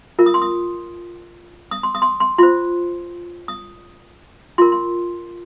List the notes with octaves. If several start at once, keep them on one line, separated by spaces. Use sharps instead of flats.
F4 A#4
D#6
C6
D#6
D#6
C6
D#6
C6
C6
F4 C5 C6
D#6
F4 A#4 C6
C6